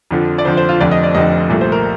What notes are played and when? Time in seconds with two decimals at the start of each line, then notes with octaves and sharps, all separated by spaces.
0.11 F2 D3 F3
0.38 D5
0.45 F2 D3 F3 C5
0.57 C5
0.69 F4
0.80 F1 F2 D3 D5
0.91 D#5
1.03 D5
1.15 F1 F2 D3 D#5
1.49 C2 A#2 A3
1.61 C5
1.72 A#4